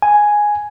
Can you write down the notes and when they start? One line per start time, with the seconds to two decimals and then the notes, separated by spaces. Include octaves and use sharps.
0.02 G#5